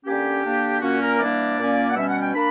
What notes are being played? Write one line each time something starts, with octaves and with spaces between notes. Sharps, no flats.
D3 A#3 C#4 G4
D3 A#3 D4
A#2 A#3 C#4 F#4
A#4
E3 G3 A#3 D4 D5
A#2 A#3 C#4
F#5
B2 G3 C#4 E5
F#5
G5
A#3 D4 B5